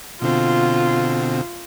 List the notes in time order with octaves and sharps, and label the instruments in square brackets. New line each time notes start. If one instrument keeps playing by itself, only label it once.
[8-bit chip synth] B2 D3 C4 [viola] F4